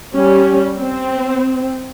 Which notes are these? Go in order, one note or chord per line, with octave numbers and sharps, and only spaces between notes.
G3 C#4
C4